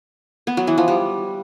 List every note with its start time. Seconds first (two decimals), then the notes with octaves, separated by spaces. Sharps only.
0.47 B3
0.57 F#3
0.67 E3
0.78 F3
0.88 G3